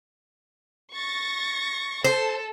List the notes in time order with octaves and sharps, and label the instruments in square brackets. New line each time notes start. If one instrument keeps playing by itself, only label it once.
[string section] C#6 A6 A#6
[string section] A4 [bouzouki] C5